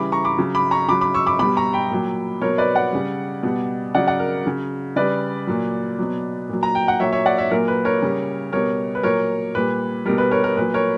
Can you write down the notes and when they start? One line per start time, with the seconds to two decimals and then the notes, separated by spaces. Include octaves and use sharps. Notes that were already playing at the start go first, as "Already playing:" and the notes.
Already playing: C#3 E3 G3 B5 D6
0.12 A#5 C#6
0.25 B5 D6
0.38 C#3 F#3
0.55 B5 D6
0.71 A#5 C#6
0.88 C#3 F#3 B5 D6
1.01 B5 D6
1.14 C#6 E6
1.27 B5 D6
1.39 B2 G3 B5 D6
1.57 A#5 C#6
1.73 G5 B5
1.91 A#2 F#3
2.42 B2 F#3 A#4 C#5
2.58 B4 D5
2.75 D5 F#5
2.93 C#3 G3
3.43 B2 G3
3.95 C#3 F#3 D5 F#5
4.07 D5 F#5
4.19 A#4
4.45 C#3 F#3
4.96 C#3 G3 B4 D5
5.47 A#2 F#3
5.99 B2 F#3
6.49 A#2 F#3
6.63 A#5
6.75 G5
6.88 F#5
7.00 A#2 F#3 C#5 E5
7.13 C#5 E5
7.26 D5 F#5
7.38 C#5 E5
7.51 A#2 F#3 A#4
7.68 B4
7.85 A#4 C#5
8.02 C#3 G3
8.53 B2 G3 A#4 C#5
8.95 B4
9.03 A#2 F#3 A#4 C#5
9.55 A#2 G3 B4
10.05 B2 G3 A#4
10.18 B4
10.31 A#4 C#5
10.44 A#4
10.57 A#2 F#3 B4
10.74 A#4 C#5